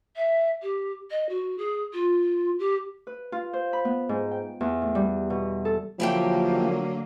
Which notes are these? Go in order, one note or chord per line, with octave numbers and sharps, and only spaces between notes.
E5
G4
D#5
F#4
G#4
F4
G4
B4
F4
C5
B5
B3
G#2
G5
E2
A2
G3
B2
A4
D3 F3 F#3 A#3 E4 G4 G5